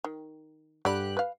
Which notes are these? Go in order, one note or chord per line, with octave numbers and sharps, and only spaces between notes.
D#3
G2 D3 G4 D5 B5 F#6
B4 F5